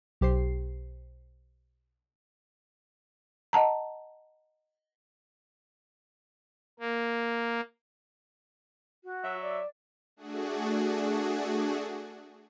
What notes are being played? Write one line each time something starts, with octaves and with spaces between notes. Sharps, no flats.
B1 G4 C5 C7
D#5 F#5 A5 A#5
A#3
F#4
F#3 E5
D5
A3 D4 F#4 G#4